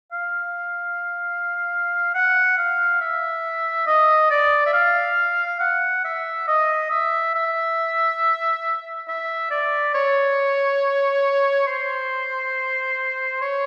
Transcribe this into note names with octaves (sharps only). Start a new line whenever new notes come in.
F5
F#5
F5
E5
D#5
D5
E5
F5
F#5
E5
D#5
E5
E5
E5
D5
C#5
C5
C#5